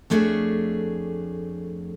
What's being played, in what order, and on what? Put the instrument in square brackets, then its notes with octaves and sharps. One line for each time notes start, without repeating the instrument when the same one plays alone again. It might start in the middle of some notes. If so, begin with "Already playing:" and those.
[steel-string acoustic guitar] F2 A3 D4 G#4 C#5 E5